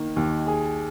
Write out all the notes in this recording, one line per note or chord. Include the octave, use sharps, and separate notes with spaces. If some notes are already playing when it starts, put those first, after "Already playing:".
Already playing: D#3 A#3
D#2
G#4